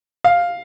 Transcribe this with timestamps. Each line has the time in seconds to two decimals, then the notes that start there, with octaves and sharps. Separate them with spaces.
0.24 F5